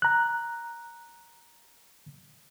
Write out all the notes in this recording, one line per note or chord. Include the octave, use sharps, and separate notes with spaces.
A#5 F#6